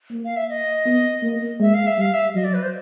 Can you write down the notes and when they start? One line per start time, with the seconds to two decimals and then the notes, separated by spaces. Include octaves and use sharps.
0.11 A#3
0.25 F5
0.36 E5
0.49 D#5
0.86 B3
1.23 A#3
1.60 G#3 E5
1.74 F5
1.87 E5
1.98 G3 F5
2.14 E5
2.35 F#3 D#5
2.44 D5
2.54 B4
2.63 C5